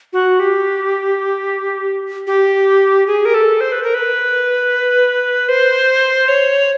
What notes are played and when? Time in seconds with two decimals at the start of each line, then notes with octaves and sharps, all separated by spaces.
0.13 F#4
0.40 G4
2.27 G4
3.07 G#4
3.25 A#4
3.34 A4
3.61 C5
3.72 B4
3.83 A#4
3.94 B4
5.49 C5
6.28 C#5